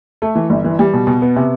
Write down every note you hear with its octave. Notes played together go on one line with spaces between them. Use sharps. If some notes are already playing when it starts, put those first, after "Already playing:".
A3
E3
G1
E3
G3
B2
B2
B3
C3